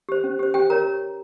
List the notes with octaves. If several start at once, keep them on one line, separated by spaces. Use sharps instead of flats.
G4 C5
C#4
G4 C5
G4 G5
A#4 C#5 A#5